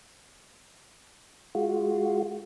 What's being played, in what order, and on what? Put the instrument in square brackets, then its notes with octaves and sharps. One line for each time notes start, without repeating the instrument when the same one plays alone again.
[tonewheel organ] G#3 F4 F#4